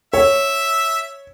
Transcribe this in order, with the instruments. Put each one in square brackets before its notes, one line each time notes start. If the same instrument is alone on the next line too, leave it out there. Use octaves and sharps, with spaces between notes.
[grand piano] C#5 [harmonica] E5